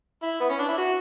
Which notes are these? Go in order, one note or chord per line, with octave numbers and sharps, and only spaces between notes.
E4
B3
C#4
D4
E4
F#4